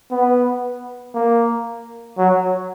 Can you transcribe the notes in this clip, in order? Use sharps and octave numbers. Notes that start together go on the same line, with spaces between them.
B3
A#3
F#3